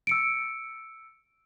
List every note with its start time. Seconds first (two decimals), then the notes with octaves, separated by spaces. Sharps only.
0.07 E6 C#7 D7